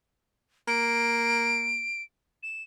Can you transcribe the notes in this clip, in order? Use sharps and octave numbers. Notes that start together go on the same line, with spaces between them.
A#3 D7
E7